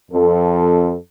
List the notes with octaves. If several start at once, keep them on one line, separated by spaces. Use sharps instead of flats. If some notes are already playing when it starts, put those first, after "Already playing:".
F2 A4